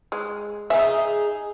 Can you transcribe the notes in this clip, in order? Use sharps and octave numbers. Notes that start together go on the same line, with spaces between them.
G#3
D#4 G#4 E5